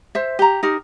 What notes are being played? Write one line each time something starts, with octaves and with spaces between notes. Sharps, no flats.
C5 E5
G4 A#5
D#4 G4 A#4